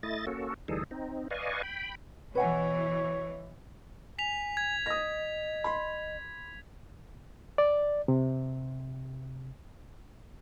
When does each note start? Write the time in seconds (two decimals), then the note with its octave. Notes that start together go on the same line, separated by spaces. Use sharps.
0.03 A3 E4 D#5 A6
0.27 A#3 C#4 F#4 A4
0.68 D2 E3 G3 D#4 G#4 A4
0.91 C4 D#4
1.31 B4 D5 D#5 F5 G#5 C#6
1.63 G5 B5
2.35 B2 E3 B4 C#5 F#5 G#5
4.19 G#5 B6 F7
4.57 G#6
4.86 D#5 D#6 A#6
5.64 B5 C6
7.58 D5
8.08 C3